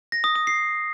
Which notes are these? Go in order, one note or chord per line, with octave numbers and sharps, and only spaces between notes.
A#6
D#6
D#6
C7